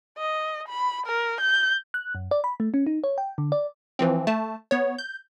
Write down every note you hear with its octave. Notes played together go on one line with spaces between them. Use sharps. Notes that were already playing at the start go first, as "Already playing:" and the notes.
D#5
B5
A#4
G6
F#6
F#2
D5
B5
A3
C#4
D#4
C#5
G5
D3
D5
E3 F3 C4
A3 A5
B3 C#5
G6